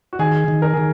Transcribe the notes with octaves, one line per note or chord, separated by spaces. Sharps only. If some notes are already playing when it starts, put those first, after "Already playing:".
F#4
D#3 G#4
D#3
A#4
D#3 G#4